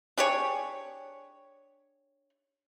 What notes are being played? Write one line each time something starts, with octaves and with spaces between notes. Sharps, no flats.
D4 G4 G#4 C#5